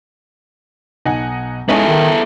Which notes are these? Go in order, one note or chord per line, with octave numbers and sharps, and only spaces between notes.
B1 D#4 F#5 G#5
G#3 B3 C#4 D#4 E4 A4 E5
D#3 G#4